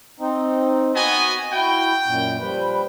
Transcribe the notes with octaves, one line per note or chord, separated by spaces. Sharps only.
C4 D#4
B3 F#4 D#5 G#5
E4 F#4 G5
F#2 A#2
F3 G3 B4